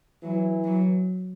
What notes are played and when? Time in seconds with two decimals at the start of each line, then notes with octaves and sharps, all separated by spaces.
0.22 E3 F#3
0.64 F#3